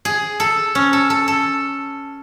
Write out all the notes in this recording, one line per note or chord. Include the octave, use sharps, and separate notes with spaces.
G#4
A4
C#4
A4
A4
A4